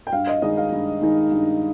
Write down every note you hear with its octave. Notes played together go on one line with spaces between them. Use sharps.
G5
G2 F5
D#5
D#3 G#3 D#4 D#5
F5
G2
D#3 G#3 D#4
G2